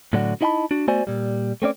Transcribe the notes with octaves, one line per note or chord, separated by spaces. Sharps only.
A2 D3 F#3 D4 F#4
D#4 E4 D#5 F5 A5 B5
D4 F#4
A3 B3 F#4 C5 D5 G#5
A#2 G3
A3 C4 C#4 D5